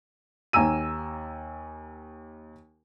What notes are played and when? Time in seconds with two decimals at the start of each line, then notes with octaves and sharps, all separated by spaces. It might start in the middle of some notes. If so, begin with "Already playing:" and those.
0.53 D#2 G#5 A#5 E6 D#7